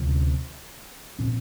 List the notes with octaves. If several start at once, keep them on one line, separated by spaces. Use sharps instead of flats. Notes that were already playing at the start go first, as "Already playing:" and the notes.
Already playing: D2 C3 F3
A#2 F3 C4